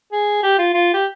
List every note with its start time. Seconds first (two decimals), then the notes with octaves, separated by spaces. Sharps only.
0.12 G#4
0.43 G4
0.59 F4
0.74 F4
0.94 G4